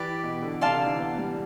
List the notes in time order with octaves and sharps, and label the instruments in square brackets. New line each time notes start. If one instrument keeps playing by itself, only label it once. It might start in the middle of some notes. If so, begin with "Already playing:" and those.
Already playing: [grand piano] E3 [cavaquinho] G4 B4 D5
[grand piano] B2
D3
[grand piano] C3 [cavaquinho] D5 F5 A5 C6
[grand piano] D3
E3
B3
G3